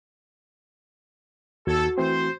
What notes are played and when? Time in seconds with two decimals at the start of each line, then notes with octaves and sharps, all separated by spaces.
1.67 D#2 F#4 A4 G#6
1.98 E3 A3 C4 C5